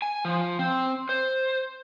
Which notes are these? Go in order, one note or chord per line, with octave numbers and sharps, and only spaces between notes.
G#5
F3
C4
C5